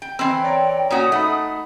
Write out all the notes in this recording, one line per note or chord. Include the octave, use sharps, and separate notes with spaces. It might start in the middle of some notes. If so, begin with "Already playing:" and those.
G5
E3 C4 G5
C#5 D5 A#5
A#2 C#4 F#4 D#6
A3 D#4 F#5 B5